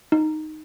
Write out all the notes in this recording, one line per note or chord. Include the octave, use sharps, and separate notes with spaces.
D#4